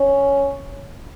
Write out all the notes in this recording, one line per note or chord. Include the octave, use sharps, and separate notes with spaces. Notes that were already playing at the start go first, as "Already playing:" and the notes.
Already playing: C#4